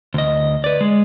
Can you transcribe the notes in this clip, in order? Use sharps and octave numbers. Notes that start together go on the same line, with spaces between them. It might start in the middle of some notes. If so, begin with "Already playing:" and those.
D2 D#5
B4 D5
G#3